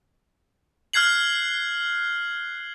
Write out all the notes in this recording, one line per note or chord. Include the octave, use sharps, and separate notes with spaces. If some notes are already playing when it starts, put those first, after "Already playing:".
F6 F#6 G#6 C7 F#7